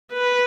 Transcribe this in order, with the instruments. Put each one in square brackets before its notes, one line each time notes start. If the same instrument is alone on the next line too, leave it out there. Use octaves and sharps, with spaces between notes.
[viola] B4